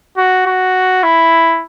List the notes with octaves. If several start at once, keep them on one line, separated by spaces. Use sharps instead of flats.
F#4
F#4
E4